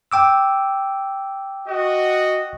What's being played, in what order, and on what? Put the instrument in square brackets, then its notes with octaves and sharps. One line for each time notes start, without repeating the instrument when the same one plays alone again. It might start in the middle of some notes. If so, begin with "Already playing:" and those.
[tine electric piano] G5 D6 E6
[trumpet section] F#4 D#5